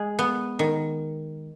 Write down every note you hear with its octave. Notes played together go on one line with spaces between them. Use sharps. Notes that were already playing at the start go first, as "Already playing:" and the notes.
Already playing: G#3 G#4
B3
D#3